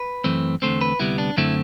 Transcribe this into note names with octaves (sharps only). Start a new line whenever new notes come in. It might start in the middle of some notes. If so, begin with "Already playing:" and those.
Already playing: B4
F#2 E3 A3 C4
E2 D3 A3 C4 C5
B4
D2 C3 G3 B3 E4
D4
F#2 D3 A3 C4 E4